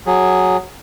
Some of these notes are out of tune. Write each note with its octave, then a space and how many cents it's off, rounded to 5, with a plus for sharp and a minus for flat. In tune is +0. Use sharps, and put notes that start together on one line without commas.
F#3 +0 G#4 +0